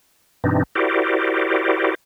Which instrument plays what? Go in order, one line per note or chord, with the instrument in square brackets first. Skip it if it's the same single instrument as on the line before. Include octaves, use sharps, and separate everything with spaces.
[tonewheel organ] G2 B2 E3 C4 D4 D#4
E4 F#4 G4 A#4 C5 D5